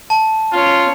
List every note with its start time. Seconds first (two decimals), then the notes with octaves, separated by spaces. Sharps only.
0.10 A5
0.52 C#4 F4 C#5